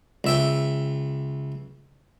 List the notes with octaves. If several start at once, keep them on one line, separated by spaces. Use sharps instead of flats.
C#2 E5 G5